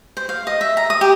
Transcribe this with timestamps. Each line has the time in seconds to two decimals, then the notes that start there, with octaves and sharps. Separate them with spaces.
0.17 C5
0.29 F5
0.47 D#5
0.61 E5
0.77 A#5
0.90 D#6
1.01 G4